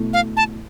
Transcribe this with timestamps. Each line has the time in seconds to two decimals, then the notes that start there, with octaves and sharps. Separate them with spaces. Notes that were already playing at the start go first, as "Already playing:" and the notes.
Already playing: B2 A3 E4
0.13 F5
0.37 A5